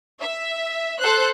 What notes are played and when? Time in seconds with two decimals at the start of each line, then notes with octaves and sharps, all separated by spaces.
0.21 E5
0.99 A4 C5 F#6